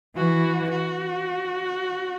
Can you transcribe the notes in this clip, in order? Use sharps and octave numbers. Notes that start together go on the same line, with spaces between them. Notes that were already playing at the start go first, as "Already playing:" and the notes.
E3 F#4
F#4